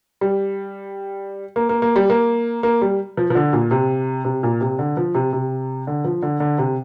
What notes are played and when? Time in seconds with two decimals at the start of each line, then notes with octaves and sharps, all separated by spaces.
0.21 G3
1.56 A#3
1.69 A#3
1.82 A#3
1.96 G3
2.10 A#3
2.63 A#3
2.82 G3
3.17 F3
3.30 F3
3.35 D3
3.53 A#2
3.71 C3
4.25 C3
4.43 A#2
4.61 C3
4.79 D3
4.97 F3
5.15 C3
5.33 C3
5.87 D3
6.04 F3
6.23 D3
6.40 D3
6.58 C3